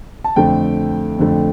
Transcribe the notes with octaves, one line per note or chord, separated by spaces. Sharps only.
A5
F2 D3 A3 G5
F2 D3 A3